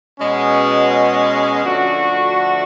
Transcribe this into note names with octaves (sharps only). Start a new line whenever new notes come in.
B2 G#3 C#4
D3 F3 A3 D4 F#4